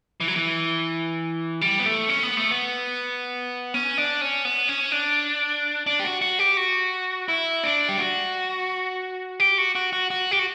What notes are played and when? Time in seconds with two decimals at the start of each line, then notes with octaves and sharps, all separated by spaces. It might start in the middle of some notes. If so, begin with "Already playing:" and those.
0.20 E3
0.28 F#3
0.36 E3
1.61 G3
1.80 B3
1.86 A3
2.09 C#4
2.23 B3
2.37 A3
2.51 B3
3.74 C#4
3.98 D4
4.21 C#4
4.45 B3
4.69 C#4
4.92 D4
5.86 D4
6.00 G4
6.04 F#4
6.21 F#4
6.39 G4
6.57 F#4
7.28 E4
7.64 D4
7.89 G4
7.99 F#4
9.40 G4
9.58 F#4
9.75 F#4
9.93 F#4
10.11 F#4
10.31 G4
10.39 F#4